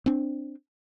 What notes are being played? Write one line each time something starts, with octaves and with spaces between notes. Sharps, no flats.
C4 D4